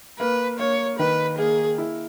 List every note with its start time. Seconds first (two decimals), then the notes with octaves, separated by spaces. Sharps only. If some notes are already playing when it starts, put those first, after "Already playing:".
0.19 A#3 B4
0.59 A#3 C#5
0.98 D#3 B4
1.38 A#3 G#4
1.78 E4